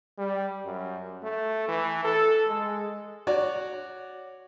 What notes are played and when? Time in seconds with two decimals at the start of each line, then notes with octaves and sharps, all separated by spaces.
0.18 G3
0.65 F#2
1.23 A3
1.68 E3
2.05 A4
2.48 G#3
3.27 F#4 C#5 D5